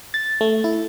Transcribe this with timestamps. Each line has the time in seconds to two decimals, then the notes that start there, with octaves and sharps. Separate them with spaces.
0.14 A6
0.41 A3
0.64 E4